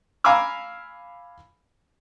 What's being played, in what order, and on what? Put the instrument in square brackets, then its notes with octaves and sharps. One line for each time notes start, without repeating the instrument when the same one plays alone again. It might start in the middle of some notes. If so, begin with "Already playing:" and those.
[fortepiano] F5 G#5 A#5 B5 D6 E6